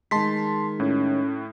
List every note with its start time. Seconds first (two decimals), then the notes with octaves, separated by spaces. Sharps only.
0.11 D#3 G#3 A5 C6 B6
0.80 A2 C#4